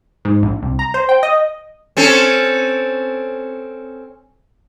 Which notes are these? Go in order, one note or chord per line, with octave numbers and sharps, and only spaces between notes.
G#2
A#1
C2
A#5
C5
G5
D#5
C4 C#4 A4